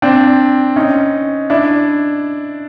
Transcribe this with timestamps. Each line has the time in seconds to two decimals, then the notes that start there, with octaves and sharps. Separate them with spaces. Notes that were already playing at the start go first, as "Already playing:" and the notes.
0.02 C4 D4
0.76 C#4 D#4
1.50 D4 E4